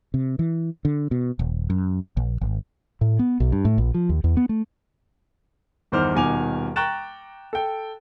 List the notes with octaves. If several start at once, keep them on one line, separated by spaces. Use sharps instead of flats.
C3
E3
D3
B2
D#1
F#2
A#1
G#1
A2
B3
B1
G2
A2
A#1
F3
D#2
E2
B3
A3
G1 E2 D#3 C5 D6 F6
D#1 B2 D#3 G#5 D6 F7
G5 A#5 C#6 F#6 A6 E7
A4 G5